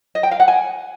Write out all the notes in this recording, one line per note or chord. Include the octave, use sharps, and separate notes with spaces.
D#5
G5
F5
F#5
G#5